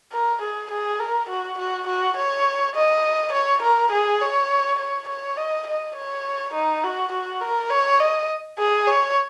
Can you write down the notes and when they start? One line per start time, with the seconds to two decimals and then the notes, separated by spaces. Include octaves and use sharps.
0.12 A#4
0.42 G#4
0.71 G#4
0.99 A#4
1.29 F#4
1.58 F#4
1.87 F#4
2.17 C#5
2.75 D#5
3.32 C#5
3.63 A#4
3.91 G#4
4.21 C#5
4.79 C#5
5.08 C#5
5.37 D#5
5.67 D#5
5.96 C#5
6.54 D#4
6.83 F#4
7.12 F#4
7.41 A#4
7.70 C#5
7.99 D#5
8.58 G#4
8.87 C#5